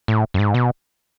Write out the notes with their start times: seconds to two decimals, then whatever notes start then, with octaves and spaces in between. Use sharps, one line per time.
0.08 A2
0.34 F#2
0.39 G#2
0.54 B2